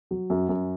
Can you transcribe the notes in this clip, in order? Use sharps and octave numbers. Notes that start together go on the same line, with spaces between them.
F#3
F#2
F#2